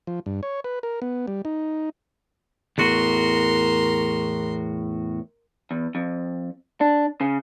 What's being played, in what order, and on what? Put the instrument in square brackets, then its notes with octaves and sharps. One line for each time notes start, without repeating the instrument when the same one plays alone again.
[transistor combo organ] F3
G2
C#5
B4
A#4
B3
G3
D#4
[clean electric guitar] E2 A2 F#4 [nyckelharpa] A#4 C6
[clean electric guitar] E2
F2
D4
C#3